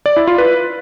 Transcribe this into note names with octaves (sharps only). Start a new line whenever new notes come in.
D5
E4
F4
B4